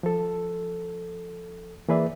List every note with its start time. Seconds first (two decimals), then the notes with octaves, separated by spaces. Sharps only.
0.03 F3 A4
1.89 E3 A#3 G#4 B4 D5 E5